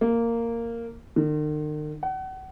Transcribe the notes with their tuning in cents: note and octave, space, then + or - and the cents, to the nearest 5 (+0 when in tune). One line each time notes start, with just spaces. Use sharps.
A#3 -10
D#3 -45
F#5 +35